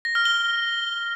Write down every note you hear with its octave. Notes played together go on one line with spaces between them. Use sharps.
A#6
F6
G7